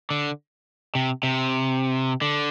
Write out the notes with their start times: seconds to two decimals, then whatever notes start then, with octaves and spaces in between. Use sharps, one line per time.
0.11 D3
0.95 C3
1.23 C3
2.22 D3